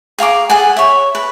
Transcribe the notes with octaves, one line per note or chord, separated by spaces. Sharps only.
G#4 F5 A#5 D6
G#4 A4 F#5 G#5
C#5 E5
B4